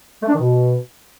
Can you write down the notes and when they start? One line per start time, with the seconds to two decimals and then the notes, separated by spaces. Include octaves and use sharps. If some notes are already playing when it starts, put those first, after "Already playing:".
0.23 A3
0.29 D4
0.34 D#3
0.40 B2